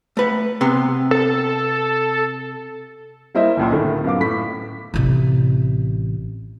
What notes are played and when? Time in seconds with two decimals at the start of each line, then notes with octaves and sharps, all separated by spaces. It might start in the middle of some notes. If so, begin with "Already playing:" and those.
0.17 A3 B4
0.61 C3 B3 C6
1.11 A4
3.34 G3 A#3 E4 C5 D#5 E5
3.57 F#1 C#2 A#2
3.72 A2 D3 D#3
4.04 F#2 B3 F5 D6
4.20 A2 B6
4.94 A1 C3